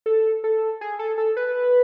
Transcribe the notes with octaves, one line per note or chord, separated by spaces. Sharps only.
A4
A4
G#4
A4
A4
B4